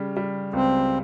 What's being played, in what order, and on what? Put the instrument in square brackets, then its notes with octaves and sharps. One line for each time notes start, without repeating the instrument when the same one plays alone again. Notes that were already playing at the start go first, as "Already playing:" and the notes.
Already playing: [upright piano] C#3 G3
G3
[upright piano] C#2 [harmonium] C4